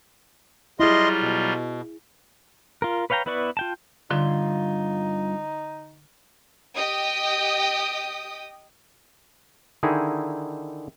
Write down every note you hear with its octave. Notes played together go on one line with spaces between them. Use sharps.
F#3 G3 E4 F4 G#4 D#5 C6
B2
F4 A#4
B4 C#5 F5 G5 A#5
B3 E4 B4 D5 C#6
F4 G5 A5
G2 D3 D#4 F4 C6
G4 D#5 G5 D#6
D3 D#3 D#4 E4 G#4